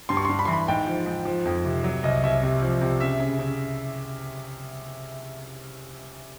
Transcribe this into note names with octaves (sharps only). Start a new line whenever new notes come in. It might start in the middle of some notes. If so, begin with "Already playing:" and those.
G2 C6
C#6
C6
G2
B5
E3 C6
B5
G#2 G5
F3
G#2
F3
F2
C3
F#3
C2 D#5
C2 E5
C3
F3
C3
C#3 E5
C#3
C#3